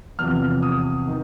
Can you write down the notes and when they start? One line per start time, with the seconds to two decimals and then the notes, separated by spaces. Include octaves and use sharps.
0.19 E2 C3 F3 F6
0.63 D#6
1.07 D#3